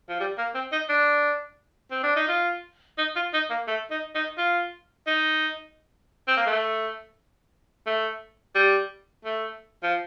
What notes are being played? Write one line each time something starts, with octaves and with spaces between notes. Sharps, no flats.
F3
G3
A#3
C4
D#4
D4
C4
D4
D#4
F4
D#4
F4
D#4
A#3
A3
D#4
D#4
F4
D#4
C4
A#3
A3
A3
G3
A3
F3